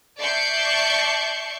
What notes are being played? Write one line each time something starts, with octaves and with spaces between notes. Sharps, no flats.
D5 E5 A5 C#6 G6 C7